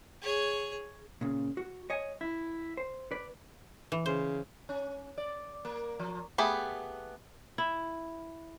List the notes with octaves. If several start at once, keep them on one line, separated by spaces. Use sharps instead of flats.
G#4 C#5
A#2 C#3
F#4
C#5 D#5 G#5
E4
C5
B4 D5
E3
C#3 C5
C#4
D5
A#3
F3
A3 B3 G4 G#4 B5
E4